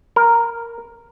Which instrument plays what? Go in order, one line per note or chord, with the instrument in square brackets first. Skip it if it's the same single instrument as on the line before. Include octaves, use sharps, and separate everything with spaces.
[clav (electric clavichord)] A#4